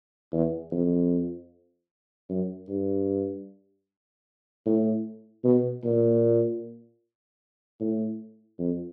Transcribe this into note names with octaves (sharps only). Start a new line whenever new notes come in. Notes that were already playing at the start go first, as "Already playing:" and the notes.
E2
F2
F#2
G2
A2
B2
A#2
A2
F2